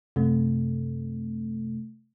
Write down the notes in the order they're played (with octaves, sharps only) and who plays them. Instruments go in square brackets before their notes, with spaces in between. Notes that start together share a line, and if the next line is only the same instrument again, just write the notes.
[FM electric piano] F#2 C3 A3